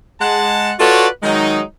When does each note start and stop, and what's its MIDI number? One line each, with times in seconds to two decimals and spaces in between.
0.21 0.72 56
0.21 0.72 78
0.21 0.72 81
0.79 1.07 65
0.79 1.07 66
0.79 1.07 69
0.79 1.07 71
0.79 1.07 73
0.79 1.07 74
1.23 1.62 51
1.23 1.62 54
1.23 1.62 56
1.23 1.62 63